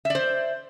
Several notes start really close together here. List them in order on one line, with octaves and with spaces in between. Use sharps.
E5 D5 C5